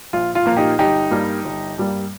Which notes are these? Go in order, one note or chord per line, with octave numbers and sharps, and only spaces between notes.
A#1 F4
F4
A#2 F3 A#3
D#4 G4
G1 D#4 G4
G2 G3 A#3
G1
G2 G3 A#3